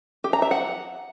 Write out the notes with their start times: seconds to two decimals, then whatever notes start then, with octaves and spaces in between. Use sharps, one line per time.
0.24 G4
0.33 A#5
0.42 E5
0.51 F#5